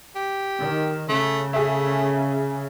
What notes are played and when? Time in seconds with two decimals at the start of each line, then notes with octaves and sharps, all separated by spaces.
0.16 G4
0.59 D#3
1.09 C#3 A3
1.53 A3 G#4 E5